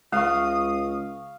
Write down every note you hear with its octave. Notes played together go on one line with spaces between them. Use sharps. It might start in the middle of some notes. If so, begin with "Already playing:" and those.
C#2 G#3 F5 C#6 D#6